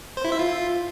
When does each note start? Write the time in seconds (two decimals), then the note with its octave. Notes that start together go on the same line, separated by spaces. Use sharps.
0.17 C5
0.25 E4
0.32 E5
0.39 F4